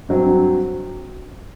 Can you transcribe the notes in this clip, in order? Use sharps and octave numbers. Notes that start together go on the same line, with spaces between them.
G2 F#3 C4